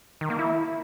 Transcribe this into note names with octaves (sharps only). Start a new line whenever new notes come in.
D#3
A#3
E4